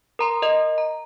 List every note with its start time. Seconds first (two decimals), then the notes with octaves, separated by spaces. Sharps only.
0.19 A#4 A#5 C6
0.42 A#4 D#5
0.78 A#5